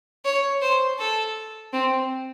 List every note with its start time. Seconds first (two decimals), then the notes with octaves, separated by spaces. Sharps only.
0.25 C#5
0.62 C5
0.99 A4
1.73 C4